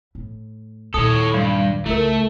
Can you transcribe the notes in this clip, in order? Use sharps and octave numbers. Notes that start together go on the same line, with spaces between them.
A2
D#2 A#2 A4 C#5 D#6
G2 F5 C6
C#2 A3 E4 A#4